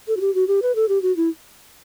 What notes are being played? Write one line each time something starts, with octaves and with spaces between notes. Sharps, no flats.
A4
F#4
G4
F#4
G4
B4
A4
G4
F#4
E4